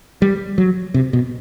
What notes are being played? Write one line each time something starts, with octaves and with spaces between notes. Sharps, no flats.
G3
F#3
C3
B2